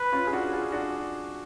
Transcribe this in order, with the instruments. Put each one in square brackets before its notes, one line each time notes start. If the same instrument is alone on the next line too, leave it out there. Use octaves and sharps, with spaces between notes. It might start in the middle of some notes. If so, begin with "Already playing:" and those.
Already playing: [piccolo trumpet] B4
[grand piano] C#4 F4
G#4
D4 F#4
F4 G#4
D4 F#4